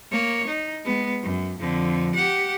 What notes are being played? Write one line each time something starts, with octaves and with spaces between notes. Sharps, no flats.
A#3 C#5
D#4
G#3 B3
F#2
F2 D3
G4 F#5